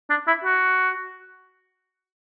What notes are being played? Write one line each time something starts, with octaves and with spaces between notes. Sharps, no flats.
D4
E4
F#4